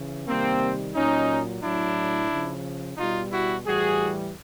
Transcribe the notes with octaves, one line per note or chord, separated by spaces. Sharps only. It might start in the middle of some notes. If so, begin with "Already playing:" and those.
Already playing: C#3 E3
C3 D#3 G3 A#3 C4
A#2 F#3 C#4 D#4
A2 F#3 D4 E4
C#3 F3
B2 G3 D#4 F4
E4 F#4
A2 E3 G3 F#4 G#4